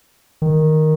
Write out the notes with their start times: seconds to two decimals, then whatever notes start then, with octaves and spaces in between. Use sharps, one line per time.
0.42 D#3